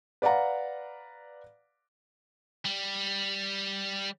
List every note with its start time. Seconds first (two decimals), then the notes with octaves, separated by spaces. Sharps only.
0.22 B4 D5 F5 F#5 A#5
2.65 G3